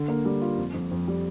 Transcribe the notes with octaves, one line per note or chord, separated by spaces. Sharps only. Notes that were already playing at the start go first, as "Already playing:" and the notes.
Already playing: D3
A#3
G3
F4
F2
F2
F2
G3